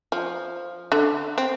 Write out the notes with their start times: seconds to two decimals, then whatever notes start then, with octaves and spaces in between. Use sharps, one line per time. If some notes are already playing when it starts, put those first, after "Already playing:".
0.12 F3
0.92 D3
1.38 C4